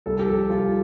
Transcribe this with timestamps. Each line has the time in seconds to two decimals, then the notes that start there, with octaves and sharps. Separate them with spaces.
0.06 C2 A4
0.19 G4
0.27 F3 A4
0.50 C2 F4